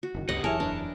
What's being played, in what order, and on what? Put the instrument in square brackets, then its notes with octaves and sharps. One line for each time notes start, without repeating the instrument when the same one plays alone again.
[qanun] F#4
[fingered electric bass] F#1 A#2 D#3
[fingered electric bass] C#2 G2 [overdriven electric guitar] B3 G4 [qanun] D#5 F#5
[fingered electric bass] E1 F#2 E3 [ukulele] E4 G#4 [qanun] A#4 C#5 [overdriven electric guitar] A5
[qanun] D4 [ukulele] B4